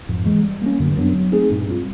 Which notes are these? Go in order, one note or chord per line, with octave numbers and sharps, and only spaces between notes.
F2 G#2
E3 G#3
G3
A#3 C#4
F#2 D3
G2
F#2 F#3 B3 D4
F#3
A3 C4 D#4 G#4
G2 A#2
G3 C4 F4